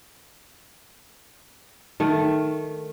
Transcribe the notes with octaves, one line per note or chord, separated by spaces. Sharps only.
D#3 A3